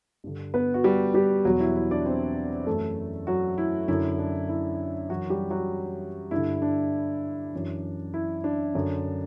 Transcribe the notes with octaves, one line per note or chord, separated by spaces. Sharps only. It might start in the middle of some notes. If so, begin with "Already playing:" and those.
G2 D3
B3 B4
F#4
G3 G4
G3 G4
E2 B2 F#3 F#4
E4
E4
D4 D5
C4 C5
F#2 E3 A3 A4
F#3 F#4
E4
F#2 D3 E4
D4
E4
F#2 E3 F#3 F#4
G3 G4
F#3 F#4
G2 D3 E4
D4
F#2 E3
E4
D4
F#2 D3